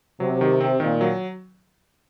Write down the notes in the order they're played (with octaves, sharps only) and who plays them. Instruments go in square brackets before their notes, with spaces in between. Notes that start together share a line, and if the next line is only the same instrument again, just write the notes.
[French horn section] C3 [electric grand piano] F#3
[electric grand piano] D#3
C4
[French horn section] A#2 [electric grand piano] D#3
[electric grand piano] F#3